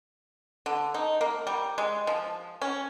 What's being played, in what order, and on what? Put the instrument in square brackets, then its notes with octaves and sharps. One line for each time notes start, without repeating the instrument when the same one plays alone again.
[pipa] D3
D#4
A#3
G3
G#3
F3
C#4